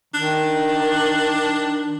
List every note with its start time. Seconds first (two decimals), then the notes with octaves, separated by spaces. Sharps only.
0.14 D#3 D4